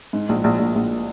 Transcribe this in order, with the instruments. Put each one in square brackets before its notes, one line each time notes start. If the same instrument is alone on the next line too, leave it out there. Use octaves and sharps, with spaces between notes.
[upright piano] G#2
A#1
A#1
A#1
A#1